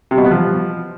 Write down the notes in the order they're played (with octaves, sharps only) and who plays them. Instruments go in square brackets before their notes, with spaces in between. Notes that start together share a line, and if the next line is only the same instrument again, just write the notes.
[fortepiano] C3
B2
B3
F3